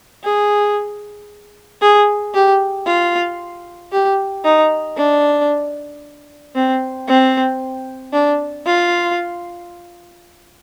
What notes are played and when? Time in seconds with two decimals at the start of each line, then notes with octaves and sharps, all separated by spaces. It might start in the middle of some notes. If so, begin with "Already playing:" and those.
0.24 G#4
1.82 G#4
2.34 G4
2.86 F4
3.92 G4
4.45 D#4
4.98 D4
6.55 C4
7.08 C4
8.13 D4
8.67 F4